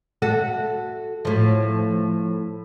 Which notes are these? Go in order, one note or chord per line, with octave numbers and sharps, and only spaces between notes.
F#4 A4 E5
A2 F3